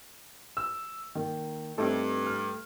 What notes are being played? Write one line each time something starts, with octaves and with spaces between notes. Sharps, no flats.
E6
D#3 A#3
G2 A3 C4 D#4 A4
F6